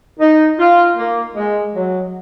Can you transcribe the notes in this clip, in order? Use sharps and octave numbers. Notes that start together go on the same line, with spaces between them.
D#4
F4
A#3
G#3
F#3